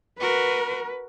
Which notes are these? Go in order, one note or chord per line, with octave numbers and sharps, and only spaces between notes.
F#4 A#4 B4